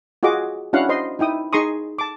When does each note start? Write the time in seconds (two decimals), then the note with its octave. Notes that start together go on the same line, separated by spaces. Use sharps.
0.23 F4 F#4 G#4 D#5 D6
0.73 C#4 D4 E4 F#4 F5 F#5
0.89 C5 D#5 C6
1.19 D#4 E4 G5 D#6
1.53 D#4 G#4 A#5 C6 C#6 D#6
1.99 A5 D6